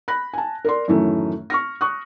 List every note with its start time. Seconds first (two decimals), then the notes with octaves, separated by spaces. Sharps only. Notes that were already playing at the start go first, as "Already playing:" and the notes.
0.08 B5 F#6 A#6
0.33 G#5 A5
0.65 A#4 D5 C6
0.88 F#2 A2 D#3 E3 A3 C#4
1.50 C#6 F6 A#6
1.81 C#6 D#6 F#6